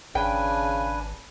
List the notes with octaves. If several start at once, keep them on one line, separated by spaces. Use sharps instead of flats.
G#1 C#3 D4 B4 G5 G#5